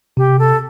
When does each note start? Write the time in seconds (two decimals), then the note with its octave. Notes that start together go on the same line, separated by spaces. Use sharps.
0.17 C3 G4
0.39 A4